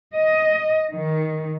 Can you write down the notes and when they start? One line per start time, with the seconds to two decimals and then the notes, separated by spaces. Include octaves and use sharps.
0.16 D#5
0.93 D#3